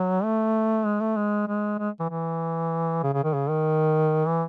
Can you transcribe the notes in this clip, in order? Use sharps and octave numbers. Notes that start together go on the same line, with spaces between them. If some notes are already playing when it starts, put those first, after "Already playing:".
Already playing: F#3
A3
G#3
A3
G#3
G#3
G#3
E3
E3
C#3
C#3
D#3
C#3
D#3
E3